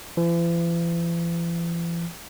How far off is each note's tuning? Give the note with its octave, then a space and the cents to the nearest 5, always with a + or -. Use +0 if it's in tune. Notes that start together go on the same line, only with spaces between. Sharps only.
E3 +45